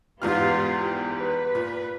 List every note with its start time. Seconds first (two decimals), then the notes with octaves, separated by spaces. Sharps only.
0.22 E2 G#2 B3 F4 G4 F6
0.80 G4
1.15 B4
1.55 A#2